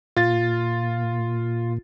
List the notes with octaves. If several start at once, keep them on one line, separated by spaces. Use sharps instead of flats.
A#2 F4 A6